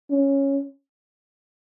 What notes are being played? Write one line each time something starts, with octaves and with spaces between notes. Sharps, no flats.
C#4